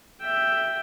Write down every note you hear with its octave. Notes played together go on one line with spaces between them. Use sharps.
E5 G5